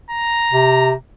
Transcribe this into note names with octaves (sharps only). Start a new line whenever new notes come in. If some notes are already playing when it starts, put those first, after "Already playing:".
A#5
C3